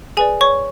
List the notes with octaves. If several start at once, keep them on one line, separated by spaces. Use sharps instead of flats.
G#4 B4 D5 G#5
C#5 C#6